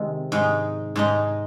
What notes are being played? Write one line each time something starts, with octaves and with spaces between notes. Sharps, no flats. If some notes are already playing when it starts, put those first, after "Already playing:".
Already playing: C3 D#3 G#3
G#2 G#3 D#4
G#2 G#3 D#4